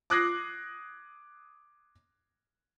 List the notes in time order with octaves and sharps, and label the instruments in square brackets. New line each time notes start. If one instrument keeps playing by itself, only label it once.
[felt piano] D6 D#6 F#6 G#6 A#6 C7